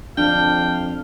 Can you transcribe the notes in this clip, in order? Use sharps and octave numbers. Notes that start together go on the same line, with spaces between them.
F2 D4 F5 G5